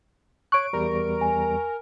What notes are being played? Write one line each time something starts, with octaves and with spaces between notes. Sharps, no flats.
C#5 C#6 F#6 D7
E2 G3 A#4
G#5